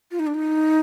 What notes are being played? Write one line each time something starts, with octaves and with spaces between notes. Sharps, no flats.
F4
D#4
D4
D#4